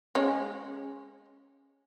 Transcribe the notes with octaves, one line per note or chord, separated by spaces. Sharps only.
G#3 C#4